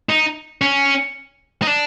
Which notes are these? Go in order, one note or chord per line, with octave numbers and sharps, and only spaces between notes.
D#4
C#4
D#4
D4